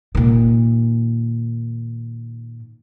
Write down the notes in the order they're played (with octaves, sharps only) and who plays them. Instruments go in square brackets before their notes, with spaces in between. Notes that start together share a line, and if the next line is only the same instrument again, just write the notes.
[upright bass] A#2 D#3